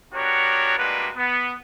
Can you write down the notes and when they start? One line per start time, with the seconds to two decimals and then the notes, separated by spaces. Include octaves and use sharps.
0.14 B3 D4 F#4 G4 A#4 C#5
0.78 G3 G#3 A#3 D4 F#4 B4
1.16 B3